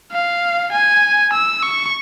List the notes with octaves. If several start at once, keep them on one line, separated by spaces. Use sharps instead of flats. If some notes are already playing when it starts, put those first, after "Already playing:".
F5
G#5
E6
C#6